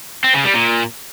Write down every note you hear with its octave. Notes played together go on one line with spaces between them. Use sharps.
C4
C#3
G3
A#2